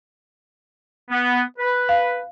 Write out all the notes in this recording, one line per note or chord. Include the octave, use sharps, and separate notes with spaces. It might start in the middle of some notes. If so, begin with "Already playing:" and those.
B3
B4
F5